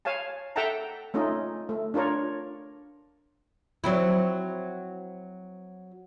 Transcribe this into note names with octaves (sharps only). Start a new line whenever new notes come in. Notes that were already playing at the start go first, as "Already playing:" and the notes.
C#5 F5 G#5 A5
A4 E5 F#5 G5 A5 A#5
A3 C#4 D#4 F4 D#5
A3
D4 F4 A#4 C#5
F#3 C4 E4